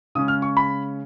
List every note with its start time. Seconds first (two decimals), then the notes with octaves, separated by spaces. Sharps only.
0.15 C#3 G#3 C#4 D#6
0.28 F6
0.42 C#6
0.57 B5